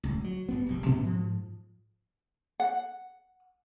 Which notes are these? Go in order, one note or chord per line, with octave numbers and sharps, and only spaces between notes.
D1 C#2
F#3
G1 G2 B3
E1 A#1 G3
A#2 B3 C#4
G#2 F3
F#5